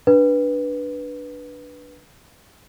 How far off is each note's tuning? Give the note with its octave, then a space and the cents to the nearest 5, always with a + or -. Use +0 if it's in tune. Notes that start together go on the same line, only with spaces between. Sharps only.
D4 +0 B4 -10